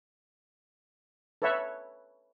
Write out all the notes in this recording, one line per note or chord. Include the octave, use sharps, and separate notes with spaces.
A4 B4 C#5 E5 F#5